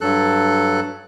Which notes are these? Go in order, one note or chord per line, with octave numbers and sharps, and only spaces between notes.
G2 F#3 A4 F#6